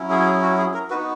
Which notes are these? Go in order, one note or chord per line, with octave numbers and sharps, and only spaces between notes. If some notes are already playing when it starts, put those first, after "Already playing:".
Already playing: F#3 C#4 E4
G#4
G#4
F#4
G#4
A#4
B3 D#4 F#4 B4